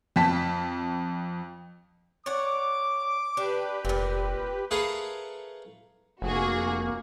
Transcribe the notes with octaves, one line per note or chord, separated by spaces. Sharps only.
F2 A5 B6
C#5 D5 F#5 D6
D4 G4 B4
F1 A#2 C4
A3 G#4 A#4 B4 C#5 F5
F1 A#3 F#4 G#4